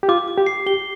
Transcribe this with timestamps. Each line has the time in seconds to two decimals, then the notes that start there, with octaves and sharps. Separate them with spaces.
0.03 G4
0.09 F4 D6
0.28 D6
0.38 G4
0.46 C7
0.66 G4 G7